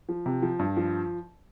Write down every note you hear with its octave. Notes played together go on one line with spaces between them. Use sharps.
F3
C3
F3
G2
F3